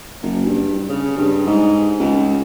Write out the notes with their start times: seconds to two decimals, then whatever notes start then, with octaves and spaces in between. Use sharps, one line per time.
0.22 F#1
0.46 G2
0.89 C#3
1.17 G2
1.47 G#2
2.00 C#2